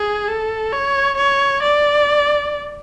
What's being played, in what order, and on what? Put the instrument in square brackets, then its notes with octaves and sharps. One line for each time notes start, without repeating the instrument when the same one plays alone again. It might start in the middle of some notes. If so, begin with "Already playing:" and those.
Already playing: [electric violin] G#4
A4
C#5
C#5
D5